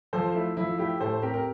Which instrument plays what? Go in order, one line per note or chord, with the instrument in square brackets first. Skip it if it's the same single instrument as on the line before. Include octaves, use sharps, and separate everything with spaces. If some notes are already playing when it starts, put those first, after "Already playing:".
[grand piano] F3 A4 C5
A3 E4
F3 E4
A3 E4 G4
A2 A4 C5
C4 G4 A#4
A#4